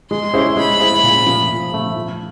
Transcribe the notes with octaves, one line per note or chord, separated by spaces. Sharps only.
G#3 C6
C#4 E4 G#4 C5
G#3 B5
C#4 E4 G#4 C5
A#2
F3 A3
A#2
F3 A3
F3